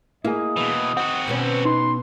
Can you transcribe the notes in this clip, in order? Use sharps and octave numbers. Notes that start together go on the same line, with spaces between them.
A#3 E4 G#4 D#5
B2 E3
C4 F#4 F#5
B2 B3 C#4
D#4 B4 C6